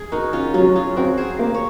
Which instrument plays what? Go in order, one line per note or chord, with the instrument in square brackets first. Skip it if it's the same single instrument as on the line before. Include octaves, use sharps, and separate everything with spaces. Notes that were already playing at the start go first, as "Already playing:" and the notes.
Already playing: [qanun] G#4
[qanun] D#4 F#4 [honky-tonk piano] A#4
[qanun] C#4 F4
[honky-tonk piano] F#3 [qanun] C#4 F4
[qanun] F4 G#4
[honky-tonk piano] C4 [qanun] F#4 A#4
[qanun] G#4 C5
[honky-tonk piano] A#3
[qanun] C#5